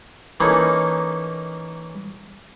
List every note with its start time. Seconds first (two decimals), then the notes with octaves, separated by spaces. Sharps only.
0.40 E3 A#3 C#4 D#4 E4 A4